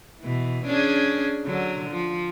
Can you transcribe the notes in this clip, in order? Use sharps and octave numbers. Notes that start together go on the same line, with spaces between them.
B2 E3
C#4 D4 G#4
D3 F#3
F3